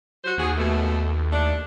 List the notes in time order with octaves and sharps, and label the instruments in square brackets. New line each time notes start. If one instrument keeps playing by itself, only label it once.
[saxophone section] F#3 F#4 C5
[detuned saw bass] D#2 [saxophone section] F#4 G#4
[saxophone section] B2 A3
A3 D4